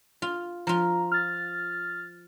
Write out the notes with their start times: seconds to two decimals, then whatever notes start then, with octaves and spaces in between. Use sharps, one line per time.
0.22 F4
0.67 F3 F4 A#5
1.12 F6 A6